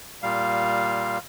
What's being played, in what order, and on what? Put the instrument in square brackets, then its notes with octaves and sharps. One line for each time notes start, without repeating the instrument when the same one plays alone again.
[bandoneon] A#2 G3 F5